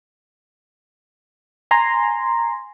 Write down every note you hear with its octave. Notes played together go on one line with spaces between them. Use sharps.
G#5 A#5 C6